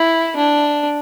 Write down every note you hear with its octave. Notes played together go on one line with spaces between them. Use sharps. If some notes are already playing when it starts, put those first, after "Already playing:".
Already playing: E4
D4